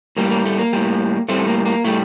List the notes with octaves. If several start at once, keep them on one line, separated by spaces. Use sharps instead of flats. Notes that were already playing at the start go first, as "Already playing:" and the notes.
A2 G3 A#3
A#3
A3
A#3
A2 G3
A2 G3 A3 C4
A#3
A#3
A2 G3 A3